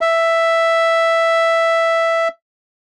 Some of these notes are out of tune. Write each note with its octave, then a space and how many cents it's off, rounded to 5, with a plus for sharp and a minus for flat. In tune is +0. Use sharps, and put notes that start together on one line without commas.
E5 +5